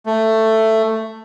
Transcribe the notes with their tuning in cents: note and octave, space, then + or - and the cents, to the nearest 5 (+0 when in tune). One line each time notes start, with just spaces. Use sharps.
A3 +10